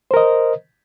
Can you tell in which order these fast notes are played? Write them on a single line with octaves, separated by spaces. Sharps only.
C5 A#4 D#5